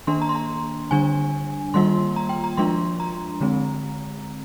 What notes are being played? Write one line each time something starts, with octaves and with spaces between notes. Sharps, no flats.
D#3 A#3 D4 C6
A#5
C6
A#5
D3 G3 D4 G#5
D#3 G3 A#3 F4 C6
A#5
G5
A#5
F3 G#3 D4 F4 C6
A#5
D3 G#3 C4